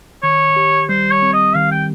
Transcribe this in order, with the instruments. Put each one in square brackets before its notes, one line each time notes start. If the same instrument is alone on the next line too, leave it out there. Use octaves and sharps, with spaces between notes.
[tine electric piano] D#3 [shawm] C#5
[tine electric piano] G4
[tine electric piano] G3 [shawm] C5
[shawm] C#5
[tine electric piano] C4
[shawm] D#5
[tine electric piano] D#3 [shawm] F5
[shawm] G5